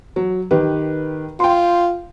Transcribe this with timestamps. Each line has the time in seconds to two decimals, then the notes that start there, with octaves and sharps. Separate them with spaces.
0.16 F#3
0.51 D#3 G4 B4
1.40 F4 G5 C6